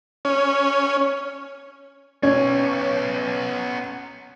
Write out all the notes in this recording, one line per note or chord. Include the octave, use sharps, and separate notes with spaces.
C#4
B3 C#4 C#5